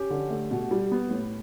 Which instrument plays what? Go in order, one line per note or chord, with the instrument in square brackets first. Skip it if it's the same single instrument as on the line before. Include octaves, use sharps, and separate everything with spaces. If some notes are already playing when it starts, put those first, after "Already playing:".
Already playing: [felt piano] C#4 G4
D3
A3
B2
G3
B3
A2